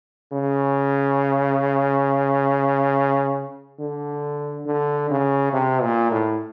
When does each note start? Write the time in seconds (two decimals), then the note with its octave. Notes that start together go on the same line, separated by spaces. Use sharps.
0.32 C#3
3.79 D3
4.66 D3
5.10 C#3
5.53 C3
5.82 A#2
6.11 A2